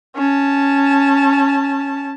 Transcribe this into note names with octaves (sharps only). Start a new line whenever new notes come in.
C#4 A5